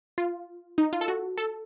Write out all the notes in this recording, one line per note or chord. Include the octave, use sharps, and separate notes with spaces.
F4
D#4
F4
A4
F#4
A4